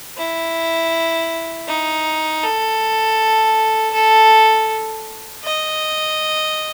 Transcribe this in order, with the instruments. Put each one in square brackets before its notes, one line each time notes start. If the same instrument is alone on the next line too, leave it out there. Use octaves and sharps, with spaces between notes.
[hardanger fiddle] E4
D#4
A4
A4
D#5